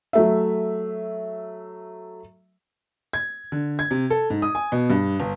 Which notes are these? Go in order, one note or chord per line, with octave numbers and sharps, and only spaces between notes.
F#3 A3 E5
G#6
D3
G#6
C3
A4
G#2
D#6
G#5
B2
G2
G1